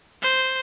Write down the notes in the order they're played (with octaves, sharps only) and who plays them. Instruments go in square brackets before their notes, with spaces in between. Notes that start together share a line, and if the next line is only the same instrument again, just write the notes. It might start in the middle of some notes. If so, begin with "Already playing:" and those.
[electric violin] C5